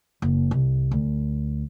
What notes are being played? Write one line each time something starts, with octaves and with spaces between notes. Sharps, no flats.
F#1
C2
D2